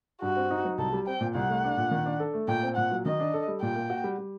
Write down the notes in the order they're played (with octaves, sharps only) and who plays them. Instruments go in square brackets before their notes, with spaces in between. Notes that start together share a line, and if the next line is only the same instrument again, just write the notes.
[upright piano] G2 [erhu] F#4
[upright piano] C4
D#4
F#3
[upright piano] C2 [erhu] A4
[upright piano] G3
[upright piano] C4 [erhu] G5
[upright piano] A#2
[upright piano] C2 [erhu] F#5
[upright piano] A3
D4
A#2
D#3
D4
A4
A3
[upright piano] A#2 [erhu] G5
[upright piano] C4
[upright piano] A#2 [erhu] F#5
[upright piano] F#3
[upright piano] D#3 [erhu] D#5
[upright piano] D4
A4
G3
[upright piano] A#2 [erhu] G5
[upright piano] A#3
F#4
G3
G3